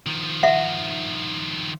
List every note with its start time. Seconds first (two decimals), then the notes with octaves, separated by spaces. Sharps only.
0.07 D#3 F3
0.43 E5 F#5